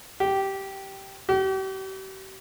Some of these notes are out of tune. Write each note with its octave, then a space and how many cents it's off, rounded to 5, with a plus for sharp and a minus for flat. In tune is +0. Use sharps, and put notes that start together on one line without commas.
G4 -10
G4 -40